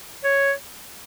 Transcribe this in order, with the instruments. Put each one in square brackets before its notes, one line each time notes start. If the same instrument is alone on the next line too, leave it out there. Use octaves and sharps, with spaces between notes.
[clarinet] C#5